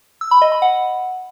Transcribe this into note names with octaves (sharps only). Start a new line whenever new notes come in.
E6
B5
D#5
B5
F#5